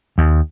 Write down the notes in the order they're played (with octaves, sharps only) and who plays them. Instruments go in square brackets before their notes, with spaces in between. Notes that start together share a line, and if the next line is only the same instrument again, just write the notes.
[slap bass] D#2